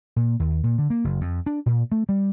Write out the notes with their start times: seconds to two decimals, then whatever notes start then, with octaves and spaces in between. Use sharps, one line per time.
0.16 A#2
0.40 D#2
0.64 A#2
0.78 D3
0.90 A#3
1.04 F#1
1.21 F2
1.46 D4
1.66 A#2
1.92 A3
2.09 G3